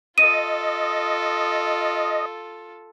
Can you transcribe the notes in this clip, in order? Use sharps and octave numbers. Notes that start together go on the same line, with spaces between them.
F4 A4 D#5 D#7